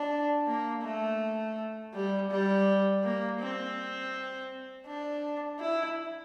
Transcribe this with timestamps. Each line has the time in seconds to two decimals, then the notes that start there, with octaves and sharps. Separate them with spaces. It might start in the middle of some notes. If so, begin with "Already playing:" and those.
Already playing: D4
0.47 A#3
0.84 A3
1.94 G3
2.30 G3
3.03 A#3
3.40 C4
4.86 D4
5.60 E4